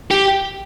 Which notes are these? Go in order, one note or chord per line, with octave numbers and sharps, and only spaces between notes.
G4